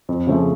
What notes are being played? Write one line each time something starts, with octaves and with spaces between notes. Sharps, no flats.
F2
C#3 F3 A3